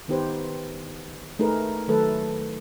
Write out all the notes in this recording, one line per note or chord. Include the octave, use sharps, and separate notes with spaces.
D#3 B3 D#4 G4 B4 C5
A3 D#4 G#4 A#4 B4
D#3 F#3 A3 A4 B4